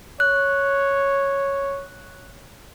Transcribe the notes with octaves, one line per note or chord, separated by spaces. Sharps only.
C#5 F#6